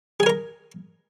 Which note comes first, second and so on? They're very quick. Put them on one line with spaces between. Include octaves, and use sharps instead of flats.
G#4 G#5 A#4 A#5